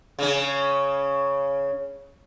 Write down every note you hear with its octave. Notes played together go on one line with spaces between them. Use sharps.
C#3 C#4